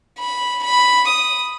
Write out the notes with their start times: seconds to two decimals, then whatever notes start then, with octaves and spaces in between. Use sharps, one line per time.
0.19 B5
0.64 B5
1.09 D#6